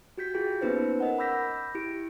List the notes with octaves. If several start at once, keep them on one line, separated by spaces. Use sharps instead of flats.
F#4 G4 G6 B6
F4 G4 G#4 G5
A#3 B3 C#4 D#4 B4 C5
A#4 D#5 F#5
B5 D6 E6 G6 A#6 B6
E4 G4 D7